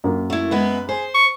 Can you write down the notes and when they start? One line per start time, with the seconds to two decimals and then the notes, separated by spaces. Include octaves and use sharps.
0.04 F#2 A#3
0.30 A3 E4
0.51 G#3 B3 B4 E5
0.89 G#4 C5
1.14 C#6